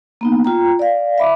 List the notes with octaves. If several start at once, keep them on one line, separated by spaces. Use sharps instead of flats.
A#3 B3 D#4
F4 G5 A#5
D5 F5
E5 B5 D6